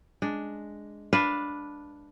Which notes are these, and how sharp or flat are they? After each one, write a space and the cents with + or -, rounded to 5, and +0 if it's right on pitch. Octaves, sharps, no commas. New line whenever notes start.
G#3 +0 D4 +0
D4 +0 B4 +0 F5 +5